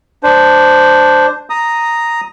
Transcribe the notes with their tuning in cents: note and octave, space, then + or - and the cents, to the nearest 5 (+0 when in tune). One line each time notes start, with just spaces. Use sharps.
D4 +0 C5 -10
A#5 +0 D#6 +0